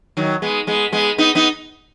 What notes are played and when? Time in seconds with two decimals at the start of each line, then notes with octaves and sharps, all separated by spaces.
0.17 D#3 F#3
0.42 G#3 B3
0.67 G#3 B3
0.92 G#3 B3
1.18 B3 D#4
1.35 B3 D#4